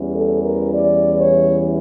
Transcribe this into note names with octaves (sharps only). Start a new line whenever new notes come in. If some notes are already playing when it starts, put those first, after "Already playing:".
Already playing: E2 E3 G3 C#4
A4
A#4
D5
C#5